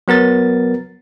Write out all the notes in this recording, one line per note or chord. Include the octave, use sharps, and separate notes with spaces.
F#3 B3 A#4 A6